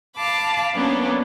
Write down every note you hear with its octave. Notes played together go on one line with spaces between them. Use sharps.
F5 A5 B5 D6
F#3 A#3 B3 C#4 D4